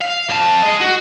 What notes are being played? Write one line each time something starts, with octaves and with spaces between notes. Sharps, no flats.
F5
F2 A5
G#4 D#5
F#4